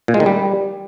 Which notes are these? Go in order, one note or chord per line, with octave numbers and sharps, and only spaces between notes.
A#2
G#3
D#3
G3